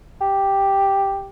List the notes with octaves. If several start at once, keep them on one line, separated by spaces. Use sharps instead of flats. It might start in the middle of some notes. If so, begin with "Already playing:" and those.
G4